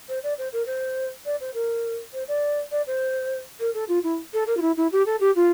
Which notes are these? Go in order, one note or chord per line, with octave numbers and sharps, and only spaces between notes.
C5
D5
C5
A#4
C5
D5
C5
A#4
C5
D5
D5
C5
A#4
A4
F4
E4
A4
A#4
F4
E4
E4
G4
A4
G4
F4